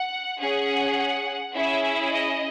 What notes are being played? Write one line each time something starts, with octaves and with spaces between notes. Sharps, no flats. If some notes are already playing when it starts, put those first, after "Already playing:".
Already playing: F#5
C#4 G#4 F#5
C#4 E4 G#4 E5
D#5